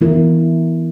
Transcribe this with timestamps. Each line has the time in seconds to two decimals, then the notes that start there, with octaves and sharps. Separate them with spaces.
0.01 E3 B3 E4 A#4